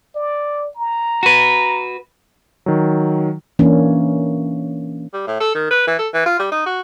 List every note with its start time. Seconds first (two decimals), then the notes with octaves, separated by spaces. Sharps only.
0.15 D5
0.76 A#5
1.23 F#4 B4
2.66 D#3 F#3
3.59 E3 A#3 C#4 D4
5.14 G3
5.27 A2
5.40 A4
5.55 D#3
5.71 B4
5.87 E3
5.99 A4
6.14 E3
6.26 F4
6.39 G3
6.52 D#4
6.66 F#4